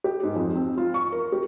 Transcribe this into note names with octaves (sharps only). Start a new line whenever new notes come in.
G4
G#2
F2
C4
F4
C#6
A#4
G4